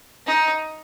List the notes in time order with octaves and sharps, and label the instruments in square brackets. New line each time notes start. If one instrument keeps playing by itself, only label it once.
[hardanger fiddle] D#4